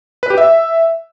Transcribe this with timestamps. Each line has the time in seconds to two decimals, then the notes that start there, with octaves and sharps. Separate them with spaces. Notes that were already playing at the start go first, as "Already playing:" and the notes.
0.23 B4
0.30 G4
0.38 E5